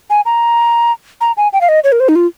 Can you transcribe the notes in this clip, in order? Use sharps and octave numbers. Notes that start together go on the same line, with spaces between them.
G#5
A#5
A#5
G#5
G5
F5
D#5
C#5
A#4
C5
D#4
F4